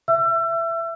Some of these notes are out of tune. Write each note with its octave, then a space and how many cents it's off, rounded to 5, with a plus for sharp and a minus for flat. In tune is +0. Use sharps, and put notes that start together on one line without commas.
E5 +15 E6 +35